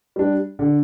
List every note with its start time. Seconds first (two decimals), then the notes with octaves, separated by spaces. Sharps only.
0.16 G3 D4
0.59 D3